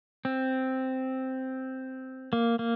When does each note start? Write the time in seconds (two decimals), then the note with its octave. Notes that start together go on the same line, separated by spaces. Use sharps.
0.25 C4
2.33 A#3
2.59 A#3